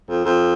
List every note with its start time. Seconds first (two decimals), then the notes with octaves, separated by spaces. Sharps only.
0.09 F2
0.25 F2